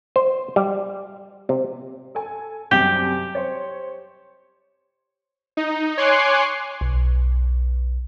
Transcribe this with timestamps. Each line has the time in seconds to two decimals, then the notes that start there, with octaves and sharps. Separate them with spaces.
0.16 C5
0.56 G3
1.49 C3
2.15 A4 G#5
2.71 F#2 C3 G3 G4
3.35 C5 C#5
5.57 D#4
5.97 C#5 G#5 C6 D6 F#6 C7
6.81 B1